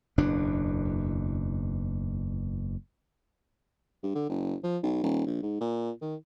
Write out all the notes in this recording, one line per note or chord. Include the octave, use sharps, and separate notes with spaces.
F#1 E2 B2 D4
G2
D3
F#1
F3
B1
D#1
A#1
G#2
A#2
D#3